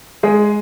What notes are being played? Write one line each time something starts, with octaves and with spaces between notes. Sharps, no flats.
G#3 G#4